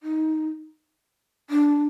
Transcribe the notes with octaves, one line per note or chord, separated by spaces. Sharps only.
D#4
D4